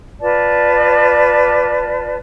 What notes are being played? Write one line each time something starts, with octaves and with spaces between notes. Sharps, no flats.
F4 B4 D5 A5